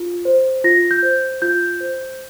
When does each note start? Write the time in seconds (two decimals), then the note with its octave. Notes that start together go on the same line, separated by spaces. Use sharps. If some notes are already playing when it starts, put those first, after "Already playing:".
Already playing: F4
0.25 C5
0.64 F4 A#6
0.91 G6
1.02 C5
1.42 F4 G6
1.80 C5